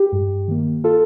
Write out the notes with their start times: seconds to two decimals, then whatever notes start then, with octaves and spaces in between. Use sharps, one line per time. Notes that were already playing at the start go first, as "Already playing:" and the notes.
Already playing: G4
0.12 G2
0.48 D#3 A#3
0.84 F4 A4